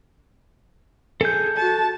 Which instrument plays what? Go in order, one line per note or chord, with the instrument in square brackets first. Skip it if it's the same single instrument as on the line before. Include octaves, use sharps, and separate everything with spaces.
[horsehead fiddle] G#4 [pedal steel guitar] A4 G6
[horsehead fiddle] F#4 A5